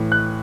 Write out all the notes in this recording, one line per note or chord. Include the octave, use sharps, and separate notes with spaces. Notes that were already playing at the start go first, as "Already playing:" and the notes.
Already playing: A2 E3
F#6